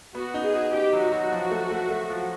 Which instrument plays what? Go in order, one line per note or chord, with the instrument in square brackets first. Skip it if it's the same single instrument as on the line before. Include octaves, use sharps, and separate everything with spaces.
[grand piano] B3 [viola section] F#4
[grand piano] D#4
[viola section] G#4
[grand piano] F#4
[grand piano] D#4 [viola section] G4
[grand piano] F#3
[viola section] F#4
[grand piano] F#3
F3
A3
A3
A3
F3